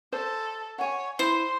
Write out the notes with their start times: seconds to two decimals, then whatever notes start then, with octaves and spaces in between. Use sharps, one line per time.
0.12 A4 C5
0.78 C#5 F#5 G#5
1.19 E4 C5 C6